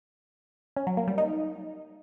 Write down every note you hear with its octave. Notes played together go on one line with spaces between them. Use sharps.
C#4
F#3
A#3
G3
D#4